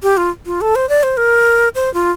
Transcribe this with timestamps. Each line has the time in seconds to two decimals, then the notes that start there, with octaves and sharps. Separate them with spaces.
0.03 G4
0.17 F4
0.46 F4
0.61 A4
0.75 C5
0.89 D5
1.03 C5
1.17 A#4
1.75 C5
1.94 F4